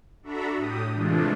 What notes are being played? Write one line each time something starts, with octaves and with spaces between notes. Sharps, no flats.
D4 F#4 A4 E5 A#5 B5
A2 G4 D#6
C3 E3 G#3 A3 D4 F4